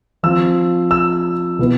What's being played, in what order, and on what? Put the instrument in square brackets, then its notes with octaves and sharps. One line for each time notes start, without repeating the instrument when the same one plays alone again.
[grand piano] F3 C4 F4 E6
E6
B2 B3 E4